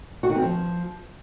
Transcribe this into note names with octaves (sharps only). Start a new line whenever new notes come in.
F#4
D#3
C4
F3